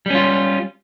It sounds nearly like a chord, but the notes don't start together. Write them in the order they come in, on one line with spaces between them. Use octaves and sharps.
G3 C#4 F4